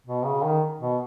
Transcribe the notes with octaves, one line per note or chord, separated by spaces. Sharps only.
B2
C#3
D#3
B2